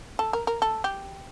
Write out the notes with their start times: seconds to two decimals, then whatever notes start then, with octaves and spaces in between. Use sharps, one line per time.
0.19 A4
0.33 A#4
0.47 A#4
0.62 A4
0.84 G4